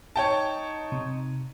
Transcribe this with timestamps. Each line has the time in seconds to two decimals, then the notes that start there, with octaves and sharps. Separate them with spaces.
0.16 D#4 C#5 G5 A5
0.92 C3